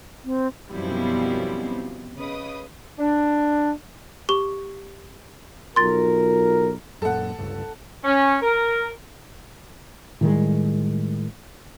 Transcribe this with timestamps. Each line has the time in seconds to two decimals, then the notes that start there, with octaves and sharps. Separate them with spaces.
0.25 C4
0.69 F#2 B2 F3 G3 C4 E4
2.16 C#3 B4 D#5 D#6
2.99 D4
4.29 G4 C#6 G7
5.76 B1 F4 A#4 C6 A6
7.02 F#2 A#2 A4 F#5
7.39 G1 C#2 G2
8.04 C#4
8.42 A#4
10.21 A2 D#3 G3 G#3